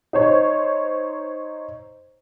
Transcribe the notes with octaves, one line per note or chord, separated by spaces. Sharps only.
D#4 C5 C#5